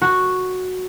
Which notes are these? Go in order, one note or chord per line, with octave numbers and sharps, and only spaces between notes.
F#4